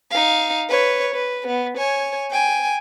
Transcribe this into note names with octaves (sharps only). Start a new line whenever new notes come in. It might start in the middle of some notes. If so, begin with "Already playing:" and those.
D#4 F5
B4 C#5
B4
B3
C#5 G#5
G5 G#5